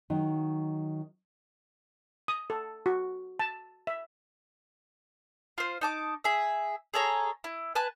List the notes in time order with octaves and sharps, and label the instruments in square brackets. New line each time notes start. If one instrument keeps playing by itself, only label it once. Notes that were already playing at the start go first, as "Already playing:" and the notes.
[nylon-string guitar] D#3 F#3 D#4
[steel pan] D#6
A4
F#4
A5
E5
[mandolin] F4 C5
D#4 A5 D6
G#4 E5
G#4 A4 C#5 A#5
E4
B4 G#5 A5 F#6